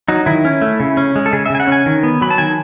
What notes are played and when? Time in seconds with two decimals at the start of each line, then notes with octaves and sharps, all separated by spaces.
0.08 F#3 D#4
0.26 D#3 E4
0.45 C#4
0.61 A3
0.80 C#3
0.97 C#4
1.16 G#3
1.26 A4
1.33 C#3 G#4
1.46 E5
1.50 C#3 G#5
1.60 F#5
1.67 C#4 G#5
1.86 D#3
2.03 B3
2.21 F#3 B5
2.30 A5
2.38 D#3 G#5